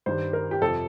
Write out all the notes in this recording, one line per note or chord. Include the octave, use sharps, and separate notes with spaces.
G2 D#3 G3 C5
A#4
G4
F2 C3 F3 A4